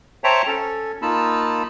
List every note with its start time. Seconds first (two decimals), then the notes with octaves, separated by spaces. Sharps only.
0.24 C5 C#5 E5 G5 A5 A#5
0.47 C#4 A4
1.02 A#3 D#4 F4 A5 B5 E6